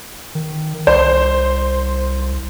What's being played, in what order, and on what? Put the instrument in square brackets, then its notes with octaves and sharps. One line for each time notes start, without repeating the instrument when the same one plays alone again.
[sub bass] D#3
[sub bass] C2 [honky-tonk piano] C5